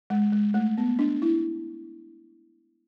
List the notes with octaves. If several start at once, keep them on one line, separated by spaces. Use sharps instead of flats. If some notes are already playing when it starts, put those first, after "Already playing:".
G#3
G#3
A3
B3
D4
E4